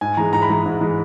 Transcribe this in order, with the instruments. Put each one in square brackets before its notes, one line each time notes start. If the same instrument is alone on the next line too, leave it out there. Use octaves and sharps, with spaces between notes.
[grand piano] G#2 G#5
E3 G#3 A#5
G#2 A#5
B5
E3 G#3 A#5
G#2
E3 G#3